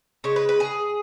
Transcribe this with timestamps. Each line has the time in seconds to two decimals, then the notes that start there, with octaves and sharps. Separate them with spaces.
0.24 C#3 G#3 C#5
0.36 B4
0.49 B4
0.60 G#4